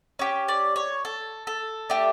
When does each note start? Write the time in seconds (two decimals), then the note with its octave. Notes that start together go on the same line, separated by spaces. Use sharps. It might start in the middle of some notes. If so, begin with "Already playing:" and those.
0.19 C#4 G4
0.48 D5
0.76 C#5
1.05 A4
1.47 A4
1.90 A3 D4 G4